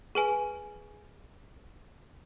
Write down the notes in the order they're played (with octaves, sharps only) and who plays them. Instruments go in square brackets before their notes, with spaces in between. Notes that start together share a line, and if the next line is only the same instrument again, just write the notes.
[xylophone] G#4 B4 G#5